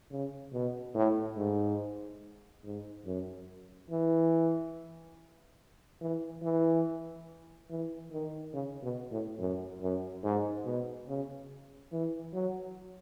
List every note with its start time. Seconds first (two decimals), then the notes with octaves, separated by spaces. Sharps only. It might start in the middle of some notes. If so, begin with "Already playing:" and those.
0.11 C#3
0.53 B2
0.95 A2
1.37 G#2
2.65 G#2
3.06 F#2
3.91 E3
6.01 E3
6.43 E3
7.70 E3
8.12 D#3
8.54 C#3
8.83 B2
9.11 A2
9.39 F#2
9.81 F#2
10.24 G#2
10.65 B2
11.08 C#3
11.92 E3
12.34 F#3